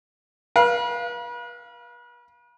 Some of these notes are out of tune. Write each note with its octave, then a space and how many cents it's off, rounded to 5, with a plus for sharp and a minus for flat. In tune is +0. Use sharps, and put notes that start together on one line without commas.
B4 -40 F5 +0